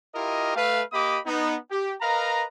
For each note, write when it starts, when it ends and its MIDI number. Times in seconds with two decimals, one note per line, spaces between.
0.15 0.54 64
0.15 0.54 65
0.15 0.54 67
0.15 0.54 70
0.15 0.54 75
0.56 0.82 57
0.56 0.82 71
0.56 0.82 77
0.92 1.19 58
0.92 1.19 67
0.92 1.19 75
0.92 1.19 83
0.92 1.19 86
0.92 1.19 87
1.26 1.57 59
1.26 1.57 63
1.71 1.94 67
2.01 2.44 70
2.01 2.44 71
2.01 2.44 75
2.01 2.44 77
2.01 2.44 82